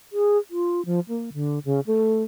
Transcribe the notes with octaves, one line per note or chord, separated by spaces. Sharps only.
G#4
F4
F3
A#3
D3
C#3
A3